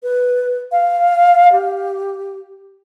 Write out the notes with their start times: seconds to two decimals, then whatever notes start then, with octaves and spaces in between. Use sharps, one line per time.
0.03 B4
0.72 F5
1.52 G4